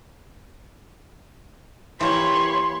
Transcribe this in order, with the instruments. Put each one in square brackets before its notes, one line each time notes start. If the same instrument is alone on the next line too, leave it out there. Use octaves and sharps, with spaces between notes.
[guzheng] E3 A#3 [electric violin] G4 B5 [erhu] C#5 [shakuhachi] C6